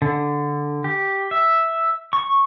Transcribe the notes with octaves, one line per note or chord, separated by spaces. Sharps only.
D3
G4
E5
C#6